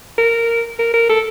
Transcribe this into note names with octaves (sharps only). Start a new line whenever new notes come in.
A#4
A#4
A#4
A4